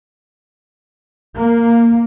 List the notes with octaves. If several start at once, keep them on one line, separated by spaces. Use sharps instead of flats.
A#3